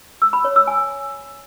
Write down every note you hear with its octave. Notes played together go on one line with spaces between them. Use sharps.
E6
B5
C#5
E6
G#5